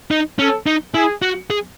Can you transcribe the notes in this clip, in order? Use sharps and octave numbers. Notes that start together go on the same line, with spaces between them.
D#4
C#4 A4
D#4
E4 G#4
F#4
G#4